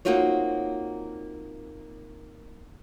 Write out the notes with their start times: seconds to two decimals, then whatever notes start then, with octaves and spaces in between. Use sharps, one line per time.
0.05 A#3 C4 D#4 F4 F#4 C#5